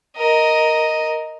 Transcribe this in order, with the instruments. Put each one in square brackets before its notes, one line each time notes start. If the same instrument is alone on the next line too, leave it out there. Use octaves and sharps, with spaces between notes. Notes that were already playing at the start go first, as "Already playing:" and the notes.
[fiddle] A#4 D#5